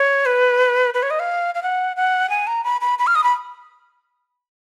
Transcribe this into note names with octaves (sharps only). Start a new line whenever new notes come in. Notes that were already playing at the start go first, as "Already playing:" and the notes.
Already playing: C#5
B4
B4
C#5
D#5
F5
F5
F#5
F#5
G#5
A#5
B5
B5
B5
F6
D#6
B5